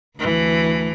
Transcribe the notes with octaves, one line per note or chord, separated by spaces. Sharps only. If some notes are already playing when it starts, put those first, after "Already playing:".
D2 E3